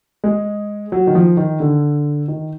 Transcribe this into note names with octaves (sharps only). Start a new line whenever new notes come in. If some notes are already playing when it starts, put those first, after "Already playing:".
G#3
F#3
D#3
F3
D#3
D3
D#3